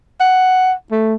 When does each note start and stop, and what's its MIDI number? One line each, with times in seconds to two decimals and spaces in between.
0.20 0.73 78
0.92 1.14 57